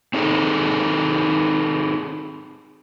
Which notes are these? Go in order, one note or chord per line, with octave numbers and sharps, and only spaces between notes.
C4 D#4 G#4 A4